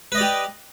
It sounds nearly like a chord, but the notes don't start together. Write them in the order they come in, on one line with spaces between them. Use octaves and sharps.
B4 D#5 D5 G4